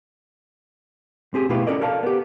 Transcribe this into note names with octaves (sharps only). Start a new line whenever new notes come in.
C4 G4 G#4
B2 A3 E4 F4 G4 B4
C#4 A4 A#4 D5 D#5
A4 A#4 D5 F5 A5
B3 G4